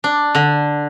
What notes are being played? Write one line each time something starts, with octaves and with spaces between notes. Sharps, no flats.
D4
D3